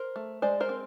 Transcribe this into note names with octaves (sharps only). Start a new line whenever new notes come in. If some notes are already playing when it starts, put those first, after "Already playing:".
Already playing: A#4 C5
A3
G#3 C5 D5
A#4 C5
C4